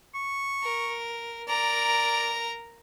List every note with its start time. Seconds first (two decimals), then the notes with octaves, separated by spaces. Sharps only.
0.14 C#6
0.63 A#4
1.48 A#4 D5 A#5